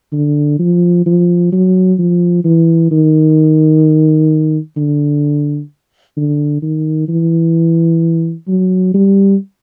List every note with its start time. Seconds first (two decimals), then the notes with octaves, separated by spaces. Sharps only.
0.13 D3
0.59 F3
1.06 F3
1.52 F#3
1.99 F3
2.44 E3
2.91 D#3
4.77 D3
6.17 D3
6.62 D#3
7.09 E3
8.48 F#3
8.94 G3